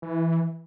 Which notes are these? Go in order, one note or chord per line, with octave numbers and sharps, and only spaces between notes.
E3